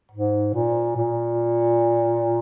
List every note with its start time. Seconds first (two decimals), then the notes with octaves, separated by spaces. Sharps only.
0.12 G#2
0.54 A#2
0.97 A#2